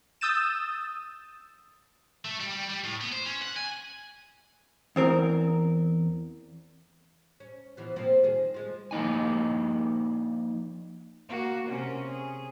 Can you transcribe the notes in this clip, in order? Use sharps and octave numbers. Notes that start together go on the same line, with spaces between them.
D#6 E6 G6 A6 D#7 E7
A3
G3
G3
G3
A2
B3
C5
C#4
F#5
G#5
E2 C4 A#4
C#4
B2 E3 F3
F3 A#3 C4
D#3 G#4
F3 G#3
F3 A#3 D#4 G#5
A#3 F#4
C3 C#4 A#4
G#4